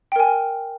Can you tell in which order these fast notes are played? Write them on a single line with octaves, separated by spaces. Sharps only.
G5 A#4 G#5